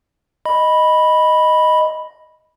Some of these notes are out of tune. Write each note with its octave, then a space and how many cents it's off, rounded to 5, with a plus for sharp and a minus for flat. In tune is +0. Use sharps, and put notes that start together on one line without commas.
D#5 +0 B5 -5